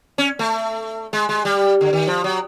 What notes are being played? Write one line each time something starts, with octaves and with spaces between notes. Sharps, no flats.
C#4
A3
G#3
G#3
G3
D3
D#3
F3
F#3